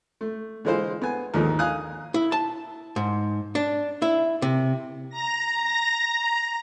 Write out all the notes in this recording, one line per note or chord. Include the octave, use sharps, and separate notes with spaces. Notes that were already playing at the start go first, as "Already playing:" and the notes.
A3
D3 E3 G#3 F4 C5
B3 G#5
D#2 G#2 D3 F3
F5 G#5 D#6 F#6
E4
A5
G#2
D4
E4
C3
A#5 A#6